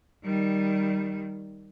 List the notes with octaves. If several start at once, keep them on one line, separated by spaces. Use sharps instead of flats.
D#3 G3